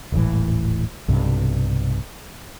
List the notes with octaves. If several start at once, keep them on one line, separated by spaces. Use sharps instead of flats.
D#1 G#1 A2 E3
B1 G2 C3